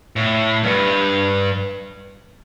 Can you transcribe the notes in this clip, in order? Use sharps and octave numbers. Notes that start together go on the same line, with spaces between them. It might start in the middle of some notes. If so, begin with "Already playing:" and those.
A2
G2